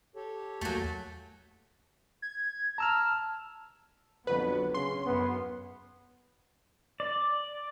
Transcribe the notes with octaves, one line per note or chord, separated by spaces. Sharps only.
G4 A4 C#5
E2 F#3 A3 A#3 F#4 G#5 A5 G6
G#6
A5 A#5 E6 F6
F2 D3 F#3 B3 B4
C#3 C#4 C6
F#2 B3
D5